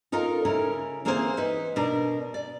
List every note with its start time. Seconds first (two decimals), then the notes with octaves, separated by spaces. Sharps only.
0.12 D#4 F4 A4 A#4
0.45 C#3 E4 A#4
1.05 E3 A#3 C4 G#4 A4 C5
1.37 D#4 B4
1.76 B2 D4 A#4
2.34 D5